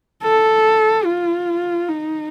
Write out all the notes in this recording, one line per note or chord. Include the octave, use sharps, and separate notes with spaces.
A4
F4
D#4